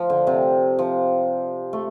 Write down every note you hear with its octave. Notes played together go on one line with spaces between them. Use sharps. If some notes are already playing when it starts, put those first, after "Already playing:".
Already playing: F3
D3
C3
F3
A3